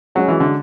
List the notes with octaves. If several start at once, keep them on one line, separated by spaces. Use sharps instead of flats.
F#3 G#3 C#4 F#4
E3
D3